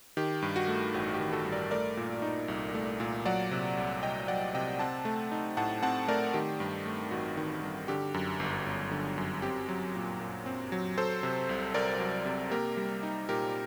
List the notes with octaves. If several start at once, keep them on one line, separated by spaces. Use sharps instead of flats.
D#3 G4
G2
F#4
A3
A1 F#4
F#4
G4
D#3
F#4 A4
G2
A#4 D5
A3 A#4 D5
A#2
D#4
C2
A3
A#2
F#3 D5 F#5
C3
C2
C2 D#5 G5
F#3 D5 F#5
C3 D#5 G5
C4 F#5 A5
A3
D#4
A2 F#5 A5
C4 F#5 A5
A3 A#4 D5
D#3 G4
G2
A3
A1 F#4
D#3
G2
D3 G4
F#2
G1
G1
D3
F#2
C4 G4
F#3
A#2
A#2
C4
F#3
F#3 A4 C5
C3
C2
C2 A#4 D5
F#3
C3
A#3 G4 A#4
G3
D#4
A#2 G4 A#4